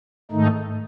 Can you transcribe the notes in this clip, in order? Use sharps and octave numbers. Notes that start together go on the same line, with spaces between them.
G#2 D#3 A3 D#4